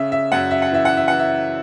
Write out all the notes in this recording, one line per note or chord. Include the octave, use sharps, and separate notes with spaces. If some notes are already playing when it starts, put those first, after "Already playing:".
Already playing: C#3 E5
E5
F#2 F#5
E5
F#5
E3 E5
F#5
E5
E3 F#5
E5